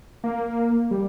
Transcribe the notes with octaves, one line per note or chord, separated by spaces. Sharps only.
A#3
G3